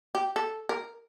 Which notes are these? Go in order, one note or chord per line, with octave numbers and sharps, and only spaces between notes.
G4
A4
A#4